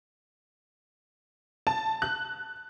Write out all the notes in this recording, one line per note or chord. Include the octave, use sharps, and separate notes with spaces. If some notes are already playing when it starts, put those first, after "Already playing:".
A5
F#6